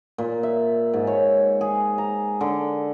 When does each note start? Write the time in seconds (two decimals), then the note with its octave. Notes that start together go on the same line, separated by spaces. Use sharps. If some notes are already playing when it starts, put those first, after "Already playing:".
0.18 A#2
0.43 E5
0.94 G#2
1.07 C#5
1.61 G#4
1.98 A#5
2.41 D3